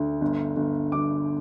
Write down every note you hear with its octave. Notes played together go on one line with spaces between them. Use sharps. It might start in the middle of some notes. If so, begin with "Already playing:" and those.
Already playing: D2
G1
G1
G1 D6